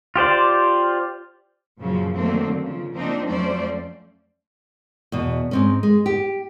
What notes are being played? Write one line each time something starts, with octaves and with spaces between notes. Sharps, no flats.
F4 G4 C5 D5
F#2 A#2 C#3 F3 F#3
D3 D#3 F#3 A3 A#3 C4
C#3 F3
F3 A#3 C4 D4 D#4
F2 F#3 A3 C#4 C5 D5
E2 B2
G#2 C4 C#4
G#3
G4